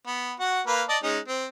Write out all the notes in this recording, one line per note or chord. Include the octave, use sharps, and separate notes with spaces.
B3
F#4 F#5
A#3 B4 F5
D5 D#5 A5
G#3 C#4 D#4
C4